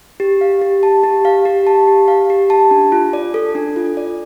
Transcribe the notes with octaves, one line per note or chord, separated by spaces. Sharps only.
G4
F5
G4
A5
G4
F5
G4
A5
G4
F5
G4
A5
D4
F4
D5
A4
D4
F4
D5